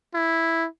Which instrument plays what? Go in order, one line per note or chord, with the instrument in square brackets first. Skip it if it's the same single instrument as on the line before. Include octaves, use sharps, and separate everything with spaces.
[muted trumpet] E4